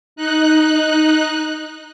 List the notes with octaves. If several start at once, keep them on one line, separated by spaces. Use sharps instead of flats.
D#4 F#6